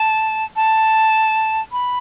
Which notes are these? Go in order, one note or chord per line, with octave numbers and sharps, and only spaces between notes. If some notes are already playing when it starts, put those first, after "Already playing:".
Already playing: A5
A5
B5